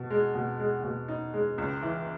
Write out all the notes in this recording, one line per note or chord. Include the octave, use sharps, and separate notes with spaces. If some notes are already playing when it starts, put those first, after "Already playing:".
Already playing: B2
G#3
B2
G#3
B2
D#4
G#3
C#2
E3